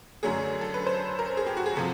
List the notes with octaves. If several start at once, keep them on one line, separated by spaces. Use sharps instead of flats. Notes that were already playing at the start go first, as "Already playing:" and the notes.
F#2 D3 F#3 A3 G#4
A4
B4
C5
A#4
G#4
G4
F#4
G#4
C3 F3 A4